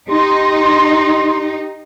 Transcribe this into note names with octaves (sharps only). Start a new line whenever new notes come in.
D#4 G4 C6